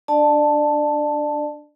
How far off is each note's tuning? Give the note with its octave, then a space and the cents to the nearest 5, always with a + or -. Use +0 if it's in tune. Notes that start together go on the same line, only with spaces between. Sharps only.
D4 +0 D5 +25 A5 +0